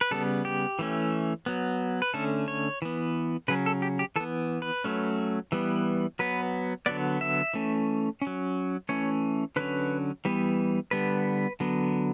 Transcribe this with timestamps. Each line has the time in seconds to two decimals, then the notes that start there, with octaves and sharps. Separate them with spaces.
0.01 B4
0.11 C#3 G3 B3 A4
0.45 G4
0.79 E3 A3 C#4
1.46 F#3 B3
2.02 B4
2.14 D3 A3 C#4 A4
2.48 C#5
2.82 E3 B3
3.48 C#3 F#3 C#4 B4
3.66 A4
3.82 G4
3.99 G4
4.16 E3 A4
4.20 B3
4.62 B4
4.84 F#3 A3 C#4
5.52 E3 G3 B3
6.19 F#3 B3 B4
6.86 D3 F#3 B3 D5
7.21 E5
7.54 E3 A3 C#4
8.21 C#4
8.27 F#3
8.89 E3 A3 C#4 C#5
9.56 D3 F#3 C#4 B4
10.25 E3 G3 B3
10.91 D3 G3 B3 B4
11.60 D3 F#3 B3